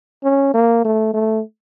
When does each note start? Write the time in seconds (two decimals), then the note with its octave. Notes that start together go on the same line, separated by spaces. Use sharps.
0.24 C#4
0.54 A#3
0.85 A3
1.14 A3